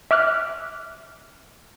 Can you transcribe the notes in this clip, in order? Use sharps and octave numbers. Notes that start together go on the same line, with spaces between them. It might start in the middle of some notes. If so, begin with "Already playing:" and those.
E5 D6 F6 F#6